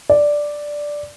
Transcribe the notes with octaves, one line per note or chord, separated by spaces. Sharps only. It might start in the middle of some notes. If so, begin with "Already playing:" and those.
D5